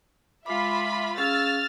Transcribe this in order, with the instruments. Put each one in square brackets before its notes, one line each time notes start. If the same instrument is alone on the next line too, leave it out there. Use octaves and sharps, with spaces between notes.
[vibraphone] G#3 D6 [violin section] F4 E5 B5
[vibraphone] C#4 G#4 F5 [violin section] E6 F6 A6